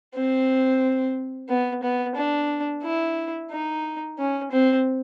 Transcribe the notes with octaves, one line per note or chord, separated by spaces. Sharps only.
C4
B3
B3
D4
E4
D#4
C#4
C4